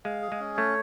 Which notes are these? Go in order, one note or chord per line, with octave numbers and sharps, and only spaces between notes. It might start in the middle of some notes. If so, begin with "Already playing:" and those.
G#3 F5
G#4
G#3
C#4
A3 C#5